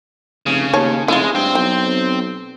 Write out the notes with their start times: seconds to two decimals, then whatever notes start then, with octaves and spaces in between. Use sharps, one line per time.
0.46 F1 C#3
0.73 D#2 C#5 A5
1.08 F1 G#3 E4 F4
1.35 G2 C4
1.55 B1 G5